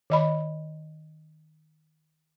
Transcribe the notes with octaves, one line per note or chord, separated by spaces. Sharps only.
D#3 D#5 B5